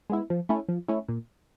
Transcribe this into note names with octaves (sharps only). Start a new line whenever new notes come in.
G#3 B3 E4
F3
A3 C#4 E4
F3
A3 C#4 E4
A#2